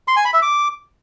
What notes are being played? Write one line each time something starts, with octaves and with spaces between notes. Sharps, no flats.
C6
G#5
B5
E5
D6